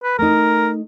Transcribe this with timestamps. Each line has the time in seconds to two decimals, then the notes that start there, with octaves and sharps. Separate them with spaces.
0.03 B4
0.19 A3 D#4 A#4